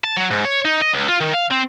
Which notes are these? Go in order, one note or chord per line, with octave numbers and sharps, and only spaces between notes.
A5
F#3
G#2
C#5
D#4
D#5
C#2
F4
D#3
F5
C4